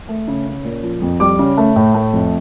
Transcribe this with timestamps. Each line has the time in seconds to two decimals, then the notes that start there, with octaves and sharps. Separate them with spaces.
0.08 A3
0.28 C#3
0.46 C#4
0.64 A#2
0.83 F3
1.02 F2
1.20 G3 D6
1.39 C#3
1.57 A3
1.76 A2
1.94 A3
2.13 F2